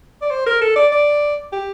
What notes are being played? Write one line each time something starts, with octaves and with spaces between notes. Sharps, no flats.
D5
C5
A#4
A4
D5
D5
G4